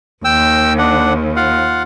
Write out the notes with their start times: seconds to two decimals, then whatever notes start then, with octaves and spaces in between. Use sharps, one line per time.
0.25 D#2 G5 E6
0.78 D4 F#5
1.36 F4 F5 F#5